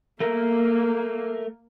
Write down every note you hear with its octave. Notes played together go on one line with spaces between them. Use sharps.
A3 A#3 A#4